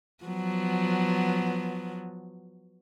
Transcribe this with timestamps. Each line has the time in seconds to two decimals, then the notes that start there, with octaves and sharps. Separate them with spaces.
0.24 F3 F#3 B3